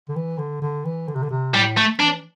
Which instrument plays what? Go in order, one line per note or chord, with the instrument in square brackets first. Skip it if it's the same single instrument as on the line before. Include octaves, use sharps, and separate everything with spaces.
[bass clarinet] D3
E3
D3
D3
E3
D3
C3
D3
C3
[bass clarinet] A2 [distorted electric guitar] G3
[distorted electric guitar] A3
[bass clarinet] E3 [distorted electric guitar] D4